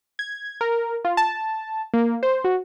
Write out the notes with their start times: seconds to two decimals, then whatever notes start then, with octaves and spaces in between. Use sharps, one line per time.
0.19 G#6
0.61 A#4
1.05 F4
1.17 A5
1.94 A#3
2.23 C5
2.44 F#4